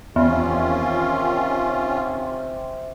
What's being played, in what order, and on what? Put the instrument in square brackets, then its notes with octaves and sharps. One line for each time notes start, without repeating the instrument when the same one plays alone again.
[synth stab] E2 [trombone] C3 [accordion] D#3 C#4 F4